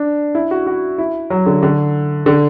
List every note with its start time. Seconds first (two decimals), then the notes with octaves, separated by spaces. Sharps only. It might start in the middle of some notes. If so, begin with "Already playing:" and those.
Already playing: D4
0.35 E4
0.51 F#4
0.67 F#4
0.98 E4
1.30 F#3
1.46 D3
1.63 D3
2.26 D3